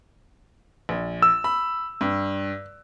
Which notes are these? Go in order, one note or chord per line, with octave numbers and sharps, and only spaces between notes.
A#1
E6
B5
G2